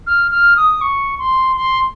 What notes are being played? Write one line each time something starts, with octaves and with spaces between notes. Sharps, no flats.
F6
F6
D#6
C#6
C6
C6